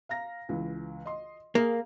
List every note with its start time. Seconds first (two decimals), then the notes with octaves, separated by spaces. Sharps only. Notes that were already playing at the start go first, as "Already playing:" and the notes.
0.09 F5 A#5 A#6
0.49 C#2 E3
1.06 D#5 C6
1.55 A#3 G#4 A#4 F5